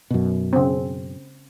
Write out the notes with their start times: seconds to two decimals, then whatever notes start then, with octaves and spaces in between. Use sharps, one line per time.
0.10 F#2 B2
0.53 C#3 C4